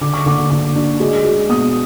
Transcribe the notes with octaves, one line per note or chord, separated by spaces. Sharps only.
D3 D6
C#6
D3 D6
D3 D6
D4
G#3
G#3
B2 D#6